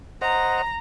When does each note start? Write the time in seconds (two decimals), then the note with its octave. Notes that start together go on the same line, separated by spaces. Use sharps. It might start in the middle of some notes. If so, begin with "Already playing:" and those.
0.22 C5 D#5 F#5 A#5